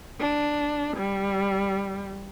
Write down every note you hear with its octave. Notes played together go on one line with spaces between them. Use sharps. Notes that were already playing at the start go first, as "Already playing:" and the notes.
D4
G3